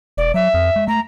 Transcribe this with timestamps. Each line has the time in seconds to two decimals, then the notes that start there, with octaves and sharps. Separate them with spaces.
0.17 E1 D5
0.34 F#3 E5
0.54 F2
0.76 G#3
0.88 A3 A#5